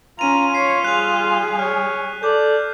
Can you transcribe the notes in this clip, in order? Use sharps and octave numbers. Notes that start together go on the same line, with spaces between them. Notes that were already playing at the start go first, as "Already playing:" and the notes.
C#4 F4 A#5 D#7 F7
C#5 B6 C7
G3 G#4 F#6 F7
C#5 F6
A4 D5 D6 G6